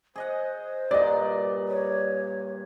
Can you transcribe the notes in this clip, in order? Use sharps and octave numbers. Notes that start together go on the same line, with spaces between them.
G#4 C5 D#5 F#5
G2 A#2 D5 D#5
C#5